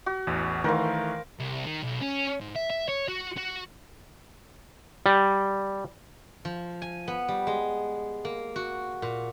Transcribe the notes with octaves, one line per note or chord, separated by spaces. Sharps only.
F#4
A1 E2
D#3 E3 A3 A#4 C5 F5
C2
D#3
B1
C#4
G#2
E5
E5
C#5
F#4
F#4
G3
F3
G#5
B3
G3
G#3
A#3
F#4
A#2